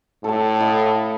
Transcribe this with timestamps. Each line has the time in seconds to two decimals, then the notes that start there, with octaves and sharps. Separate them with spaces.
0.24 A2 A4 A5
0.60 E4 D#5 F5